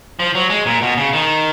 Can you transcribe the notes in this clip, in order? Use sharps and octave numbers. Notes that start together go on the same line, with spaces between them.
F3
F#3
G#3
A#2
B2
C#3
D#3